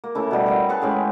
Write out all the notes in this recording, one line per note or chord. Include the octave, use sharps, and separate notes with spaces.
A#3
C#3 A3 E4
B2 G3
A#4 F5 F#5
G#4 B4 A5 C#6
A2 G#3 C#4 G4